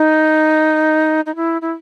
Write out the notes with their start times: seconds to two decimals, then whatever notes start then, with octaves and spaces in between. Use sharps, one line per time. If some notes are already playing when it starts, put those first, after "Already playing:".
Already playing: D#4
1.26 D#4
1.35 E4
1.61 E4